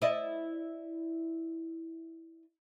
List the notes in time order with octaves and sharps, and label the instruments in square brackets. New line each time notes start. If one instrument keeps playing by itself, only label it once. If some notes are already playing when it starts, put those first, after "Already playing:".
[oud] E4 D5 D#5